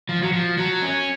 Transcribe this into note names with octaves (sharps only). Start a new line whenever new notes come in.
F3
F#3
F3
F#3
C#4